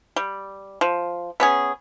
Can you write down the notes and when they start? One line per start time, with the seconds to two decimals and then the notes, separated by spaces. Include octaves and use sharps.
0.16 G3
0.81 F3
1.40 B3 C#4 G#4